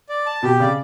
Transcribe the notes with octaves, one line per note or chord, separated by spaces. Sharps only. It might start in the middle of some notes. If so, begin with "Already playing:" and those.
D5
A5
B2 G4
C#3 D5